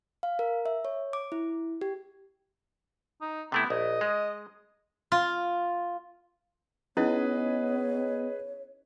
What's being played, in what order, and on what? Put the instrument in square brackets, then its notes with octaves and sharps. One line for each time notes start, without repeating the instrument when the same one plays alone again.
[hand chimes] F5
A#4
E5
C#5
D6
E4
G4
[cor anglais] D#4
[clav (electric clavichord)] C3 A3 E4 [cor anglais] B3
[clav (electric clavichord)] A#1 [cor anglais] D#5
[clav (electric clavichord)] G#3
[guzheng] F4
[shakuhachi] B3 [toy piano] C#4 D#4 E4 [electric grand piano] G#4 B4 D#5 [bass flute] C#5